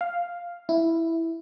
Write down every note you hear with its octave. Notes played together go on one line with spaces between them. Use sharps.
F5
E4